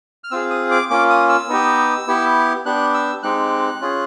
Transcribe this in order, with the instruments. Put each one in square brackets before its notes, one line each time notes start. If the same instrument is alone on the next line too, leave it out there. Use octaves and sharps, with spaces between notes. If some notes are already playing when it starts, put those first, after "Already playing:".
[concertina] F6
C4 F4 G#4 E6
D#6
D6
A#3 C#4 F4 D6
D#6
E6
B3 D#4 G4
B3 E4 G4
B3 D4 G4 F#6
E6
G#3 C4 D#4 G4 F#6
C#4 F4 G#4